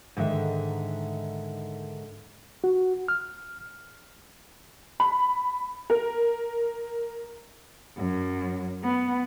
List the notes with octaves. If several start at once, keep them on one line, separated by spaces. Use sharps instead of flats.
G#2 D3 D#3 E5
F#4
F6
B5
A#4
F#2
B3